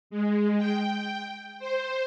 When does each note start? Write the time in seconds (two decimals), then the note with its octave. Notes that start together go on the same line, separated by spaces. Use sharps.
0.10 G#3
0.58 G5
1.59 C5